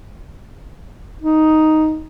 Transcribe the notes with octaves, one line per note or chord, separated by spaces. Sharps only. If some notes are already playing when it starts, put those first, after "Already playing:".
D#4